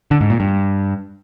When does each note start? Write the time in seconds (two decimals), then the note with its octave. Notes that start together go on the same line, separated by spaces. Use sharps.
0.11 D3
0.21 G#2
0.30 A#2
0.40 G2